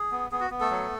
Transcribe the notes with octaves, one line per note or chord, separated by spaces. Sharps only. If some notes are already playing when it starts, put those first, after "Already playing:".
Already playing: G#4
B3
B3 G#4
F#4
B3
A3 A4
F#3